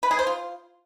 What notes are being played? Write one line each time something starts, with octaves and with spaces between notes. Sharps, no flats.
B4
G#4
C5
F4